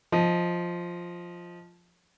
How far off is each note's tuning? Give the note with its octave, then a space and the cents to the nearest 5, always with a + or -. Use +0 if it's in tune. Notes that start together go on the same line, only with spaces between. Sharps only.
F3 +0 D#5 +0